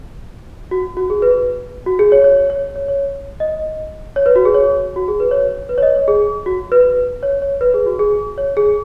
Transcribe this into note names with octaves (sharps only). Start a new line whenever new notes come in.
F#4
F#4
G#4
B4
F#4
G#4
C#5
C#5
C#5
C#5
C#5
C#5
D#5
C#5
B4
F#4
G#4
C#5
F#4
G#4
B4
C#5
B4
C#5
D#5
C#5
G#4
F#4
B4
C#5
C#5
B4
G#4
F#4
G#4
C#5
G#4